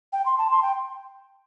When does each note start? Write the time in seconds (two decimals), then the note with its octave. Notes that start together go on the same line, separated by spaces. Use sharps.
0.13 G5
0.26 C6
0.38 A5
0.51 C6
0.62 G5